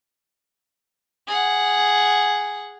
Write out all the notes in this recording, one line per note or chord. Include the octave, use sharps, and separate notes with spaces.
G#4 F#5